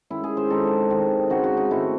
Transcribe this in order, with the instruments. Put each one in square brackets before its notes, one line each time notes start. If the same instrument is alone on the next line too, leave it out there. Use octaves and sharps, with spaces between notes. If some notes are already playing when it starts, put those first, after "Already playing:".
[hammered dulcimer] D#3 G#3 C#4 E4
G#4
C5
D#3 G#3 C4 D#4 A4
C3 D#3 G#3 C4
C#3 G#3 C4 D#4 F#4
F#4
D#4
G#2 D#3 A3 C4 E4